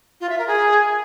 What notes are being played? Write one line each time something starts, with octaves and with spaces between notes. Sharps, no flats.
F4
E5
A#4
G#4